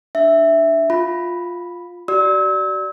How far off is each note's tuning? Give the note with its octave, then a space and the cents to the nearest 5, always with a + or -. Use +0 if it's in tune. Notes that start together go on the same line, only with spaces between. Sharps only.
D4 +0 E5 +0
F4 +10 B5 +0
F#4 +40 D5 +0 E6 -35